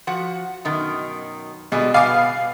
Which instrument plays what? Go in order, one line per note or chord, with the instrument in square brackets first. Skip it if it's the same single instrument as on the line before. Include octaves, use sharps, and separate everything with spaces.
[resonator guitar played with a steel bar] F3 F#4 F#5
F#2 B2 D#3
[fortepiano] B2 [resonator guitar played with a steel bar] G3 G#3 G#4
[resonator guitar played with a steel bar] B2 B3 [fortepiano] F5 G#5 D6